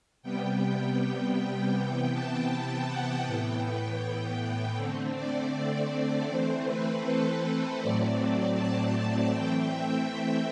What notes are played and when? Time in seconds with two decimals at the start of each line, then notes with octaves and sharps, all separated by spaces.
0.22 C3 G3 B3 G5
0.61 G5
0.98 G5
1.36 G5
1.73 C3 E3 B3 G5
2.12 A5
2.50 G5
2.88 F#5
3.25 A2 E3 B3 G5
4.00 G5
4.38 G5
4.76 D3 A3 C4
5.14 D5
6.27 E3 A3 C4 C5
6.65 B4
7.03 A4
7.41 B4
7.78 A2 F#3 A3 C4 D5
8.54 A5
9.31 E3 A3 C4 G5
9.67 E5